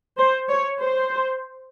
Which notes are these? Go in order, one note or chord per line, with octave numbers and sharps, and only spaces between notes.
C5
C#5
C5